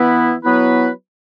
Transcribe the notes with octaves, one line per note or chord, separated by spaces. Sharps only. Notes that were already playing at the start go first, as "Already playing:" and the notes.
Already playing: E3 B3 E4 B4
F#3 B3 E4 B4